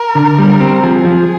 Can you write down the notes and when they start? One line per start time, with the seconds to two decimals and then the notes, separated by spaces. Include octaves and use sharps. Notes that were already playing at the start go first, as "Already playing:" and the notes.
Already playing: A#4
0.15 D3
0.39 G3
0.60 C4
0.83 F3 G#4
1.05 F3